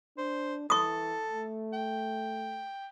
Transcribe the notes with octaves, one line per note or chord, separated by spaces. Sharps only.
D4 C5
E3 A4 C#6 D#6
A3
G5